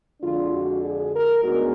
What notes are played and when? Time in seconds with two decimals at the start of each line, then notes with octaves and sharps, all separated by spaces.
0.22 F2 D3 G#3 D4 F4
0.53 F#4
0.83 G#4
1.13 A#4
1.43 D2 D3 G#3 B3 D#4 F#4